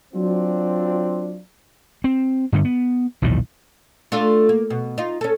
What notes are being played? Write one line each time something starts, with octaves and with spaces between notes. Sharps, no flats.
F#3 C4 D4 F4
C4
G2 D3 A3
B3
B1 E2 A#2 D#3
A3 D4 F4
A#3
B2
D#4 F4
C#4 A4